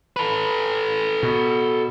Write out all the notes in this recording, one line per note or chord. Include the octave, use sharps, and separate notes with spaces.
A4 B4
B2